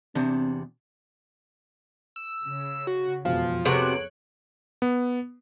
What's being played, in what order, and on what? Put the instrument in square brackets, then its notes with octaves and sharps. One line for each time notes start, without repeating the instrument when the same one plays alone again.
[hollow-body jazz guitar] E2 C3 D4 [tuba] C4
[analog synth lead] E6
[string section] C#3
[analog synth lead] F#4
[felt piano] E1 F5 [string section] F2 B2 [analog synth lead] F3
[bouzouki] C3 F#4 [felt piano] B3 G#4 A4 [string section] C#5 F#6 [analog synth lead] D7
[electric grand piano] B3